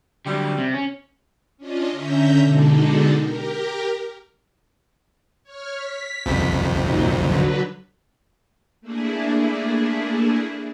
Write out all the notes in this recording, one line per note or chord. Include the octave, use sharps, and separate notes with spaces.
D3 F#3 G3
C3
C#4
C#4 D4 F4 D#5
D3 C#4 E5 A#5 G6
B2 D3 G#3 D4 D#4 A4
G4 A#4
C#5 F6
B6
C2 F2
A#2 F#3 D#4
D3 F#3 B4
A3 A#3 D4 E4 G#4